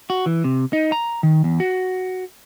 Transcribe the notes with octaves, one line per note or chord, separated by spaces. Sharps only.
F#4
E3
C3
D#4
A#5
D#3
E2
F#4